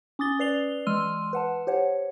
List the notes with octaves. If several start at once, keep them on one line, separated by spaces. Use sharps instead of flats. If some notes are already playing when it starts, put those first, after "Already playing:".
C#4 D6 D#6 A6 G7
B4 D5 C7 F7 G7
E3 G#3 C6 E6 F6 D#7
B4 F#5 A5
G4 C5 C#5 F#5